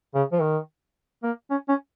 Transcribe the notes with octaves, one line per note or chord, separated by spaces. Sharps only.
C#3
F3
D#3
A#3
C#4
C#4